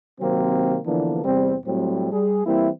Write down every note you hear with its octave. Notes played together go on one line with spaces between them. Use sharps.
C3 D#3 F#3 A#3 C4
D3 E3 F3 A#3 B3 D4
E2 C3 G3 C4
A2 F#3 G3 C4
G3 G#4
E3 G3 A#3 C4 E4